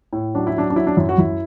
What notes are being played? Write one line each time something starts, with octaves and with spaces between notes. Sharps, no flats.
A2
F#3 D4
E4
F#3 D4
D4
F#3 E4
D4
F#2 E4
F#4
F#2 E4